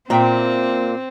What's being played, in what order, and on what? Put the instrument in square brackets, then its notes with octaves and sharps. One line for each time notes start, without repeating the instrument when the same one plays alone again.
[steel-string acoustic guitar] A#2 A#3 [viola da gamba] C4 [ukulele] E5 G5 A#5